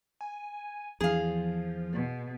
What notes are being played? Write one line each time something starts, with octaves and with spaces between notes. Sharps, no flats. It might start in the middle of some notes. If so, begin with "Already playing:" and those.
G#5
E2 F3 G#4 F5
B2